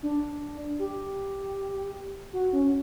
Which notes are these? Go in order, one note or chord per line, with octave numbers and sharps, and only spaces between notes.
D4
G4
F#4
C#4